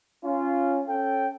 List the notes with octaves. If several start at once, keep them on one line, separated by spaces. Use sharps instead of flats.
C#4 F4
C#4 A4 G5